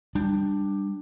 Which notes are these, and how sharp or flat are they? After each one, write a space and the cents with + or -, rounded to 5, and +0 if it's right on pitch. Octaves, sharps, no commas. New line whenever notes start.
G3 +10 D4 +10